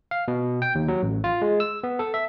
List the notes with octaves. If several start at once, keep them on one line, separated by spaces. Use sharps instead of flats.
F5
B2
G5
D#2
F#3
A1
F4
G#3
E6
B3
A4
E5